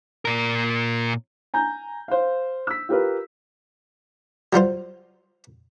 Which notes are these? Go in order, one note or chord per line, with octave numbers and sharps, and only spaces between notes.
A#2 A#4
G#5 A#5 G6
C5 F5
E6 B6
F4 G4 A#4 B4
F#3 G3 F4 C5